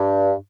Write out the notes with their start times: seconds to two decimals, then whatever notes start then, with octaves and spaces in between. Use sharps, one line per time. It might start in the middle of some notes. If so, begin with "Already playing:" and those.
Already playing: G2